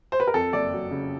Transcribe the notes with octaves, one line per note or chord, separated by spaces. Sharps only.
C5
B4
A#4
F2 A4
F#1 D5
F#3
C#3